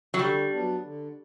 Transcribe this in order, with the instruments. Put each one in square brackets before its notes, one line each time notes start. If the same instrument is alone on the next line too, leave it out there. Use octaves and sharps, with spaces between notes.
[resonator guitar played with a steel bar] F#3
[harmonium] D3 [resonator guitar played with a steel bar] G3
[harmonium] F#3 B3 D4
D3